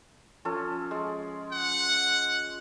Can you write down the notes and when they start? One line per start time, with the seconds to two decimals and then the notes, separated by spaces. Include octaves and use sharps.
0.45 F3 C#4 A4
0.91 G#3
1.52 F#5